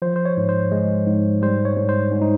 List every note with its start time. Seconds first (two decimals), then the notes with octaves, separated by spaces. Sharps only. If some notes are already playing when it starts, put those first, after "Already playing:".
0.02 F3 C5
0.16 C5
0.26 C#5
0.37 G#2
0.49 C5
0.72 G#3
1.07 G#2
1.42 G3 C5
1.65 C#5
1.77 G#2
1.89 C5
2.12 G#2
2.22 D#4